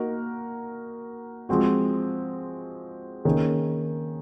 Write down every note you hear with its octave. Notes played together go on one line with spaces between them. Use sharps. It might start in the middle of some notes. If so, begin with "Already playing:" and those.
Already playing: A#3 D#4 F#4 A#4
F3 G#3 C4 F#4
D#3 A#3 C#4 G#4